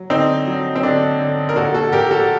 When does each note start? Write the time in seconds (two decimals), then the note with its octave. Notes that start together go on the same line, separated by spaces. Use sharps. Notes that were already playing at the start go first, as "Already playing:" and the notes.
Already playing: F#3
0.10 D3 C4 D#4
0.47 F#3
0.76 C4
0.83 D3 D4
1.20 D3
1.49 A#4
1.56 A#2 F#4 A4
1.74 F#4 A4
1.92 A#2 G4 A#4
2.11 F#4 A4